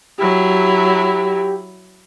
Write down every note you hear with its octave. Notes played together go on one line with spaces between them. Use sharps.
F#3 E4 G4